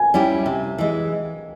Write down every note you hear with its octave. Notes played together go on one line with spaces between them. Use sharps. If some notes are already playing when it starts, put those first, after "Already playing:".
Already playing: G#5
G3 C#4 E4 G4
C3
E3 G#3